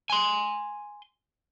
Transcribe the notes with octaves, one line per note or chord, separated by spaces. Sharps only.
G#5 C6